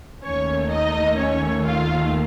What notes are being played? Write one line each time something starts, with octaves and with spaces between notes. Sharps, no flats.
D#2 D#3 A3 C#4 C#5
D#4 D#5
C#4 C#5
F4 F5